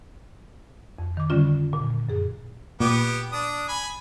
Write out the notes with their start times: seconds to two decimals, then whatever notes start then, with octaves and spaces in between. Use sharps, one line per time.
0.99 F2
1.17 D#3 D6
1.30 D3 G3 C#4 F4
1.73 A#2
2.09 F#2 G#4
2.80 A#2 B3 G4 D6
3.33 D4 D#6
3.68 G#5 B5